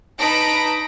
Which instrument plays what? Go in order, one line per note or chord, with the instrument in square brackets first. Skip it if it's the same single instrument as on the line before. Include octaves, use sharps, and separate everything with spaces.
[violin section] D#4 B4 A5 B5 A#6 D7